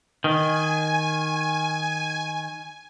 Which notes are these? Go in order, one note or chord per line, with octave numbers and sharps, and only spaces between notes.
D#3 G#5